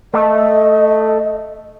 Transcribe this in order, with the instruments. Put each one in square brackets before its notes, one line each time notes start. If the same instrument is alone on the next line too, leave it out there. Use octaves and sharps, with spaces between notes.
[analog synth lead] A3 [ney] D#5